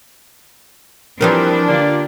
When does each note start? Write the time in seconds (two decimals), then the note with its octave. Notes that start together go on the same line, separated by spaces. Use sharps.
1.21 E3 F3 G3 C4 D4 A#4 B4 G5
1.68 D3 A#3 F4 G4 D5